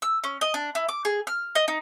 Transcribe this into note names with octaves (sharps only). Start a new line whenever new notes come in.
E6
C#4
D#5
D4
E4
D6
G#4
F6
D#5
D#4